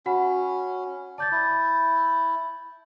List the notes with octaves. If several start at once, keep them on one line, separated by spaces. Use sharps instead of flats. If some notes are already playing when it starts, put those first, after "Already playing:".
C#4 F#4 F#5 B5
D5 A5 G6 A6
E4